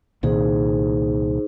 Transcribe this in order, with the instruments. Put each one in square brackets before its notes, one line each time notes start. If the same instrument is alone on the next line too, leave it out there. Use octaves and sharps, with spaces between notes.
[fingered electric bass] C2 A#2 D#3 [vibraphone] D#4 G#4 C5